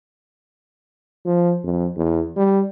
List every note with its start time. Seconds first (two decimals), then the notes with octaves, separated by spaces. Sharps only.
1.25 F3
1.64 F2
1.96 E2
2.36 G3